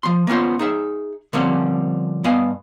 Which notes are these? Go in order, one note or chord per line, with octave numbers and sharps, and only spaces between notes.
F3 C6
A#3 B3 C#4 F4 C5
D#4 G#4 E5
D3 F3 G3 A#3 C4 C#4
G2 B3 D#5 F5 G#5